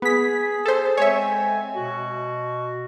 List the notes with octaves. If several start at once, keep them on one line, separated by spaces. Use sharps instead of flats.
B3 G#4 B6
A4 C5
G#3 C4 C#5 E5 G#5
B2 F#4